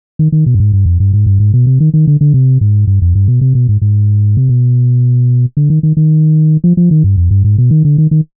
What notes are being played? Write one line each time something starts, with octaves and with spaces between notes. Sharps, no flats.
D#3
D#3
B2
G2
G#2
G2
F2
G2
G#2
G2
G#2
B2
C3
D#3
D#3
D3
D3
C3
G#2
G2
F2
G2
B2
C3
B2
G#2
G#2
C3
B2
D3
D#3
D#3
D#3
F3
F3
D#3
G2
F2
G2
G#2
B2
D#3
D3
D#3
D#3